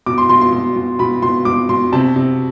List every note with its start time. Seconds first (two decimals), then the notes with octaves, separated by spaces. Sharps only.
0.06 B2 D6
0.18 C6
0.29 B2 C6
0.41 C6
0.53 B2
0.76 B2
0.99 B2 B5
1.22 B2 C6
1.45 B2 D6
1.69 B2 C6
1.93 C3 A5
2.16 C3